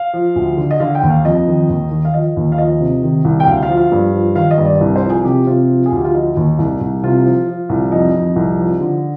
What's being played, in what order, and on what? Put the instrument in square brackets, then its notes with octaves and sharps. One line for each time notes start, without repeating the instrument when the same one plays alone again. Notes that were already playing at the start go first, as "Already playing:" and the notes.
Already playing: [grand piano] F5
F3
D2
D3
D#5
D3 F5
G5
D#2
F5
F2 D#5
D#3
D#2
D#3
F5
F3 D#5
D#2
F5
F3 D#5
C3
D#3
C2
G5
D2 F5
F5
F3
F5
G2
F3
D#3 F5
D#5
G2
D5
C2
C5
F3
G#4
C3 G4
C3 F4
F3
G#4
D2 G4
F4
F3 D#4
D#2
C2
C2
C3 F4
F3
F3
C2
F2 D#4
F2
C2
F3
D3